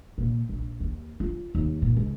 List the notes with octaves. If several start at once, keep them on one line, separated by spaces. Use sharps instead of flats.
A#2
A#1
D#2
F4
D#2
A#2
C#2